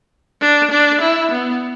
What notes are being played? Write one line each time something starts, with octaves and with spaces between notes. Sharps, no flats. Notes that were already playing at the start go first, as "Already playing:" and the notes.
D4
D4
E4
B3